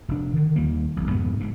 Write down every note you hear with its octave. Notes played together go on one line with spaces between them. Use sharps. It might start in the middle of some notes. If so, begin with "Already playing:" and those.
F1 D4
D3 D#3
D#2 G3 A#3
E1 B1
F2 G#2 C3 B3
F1 G#2 C3